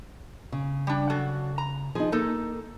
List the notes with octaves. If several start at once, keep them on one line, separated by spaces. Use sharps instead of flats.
C#3
G3 D4
F#3 F#4 A4
A#5
F3 D#4 G#4
A#3 D#4 A4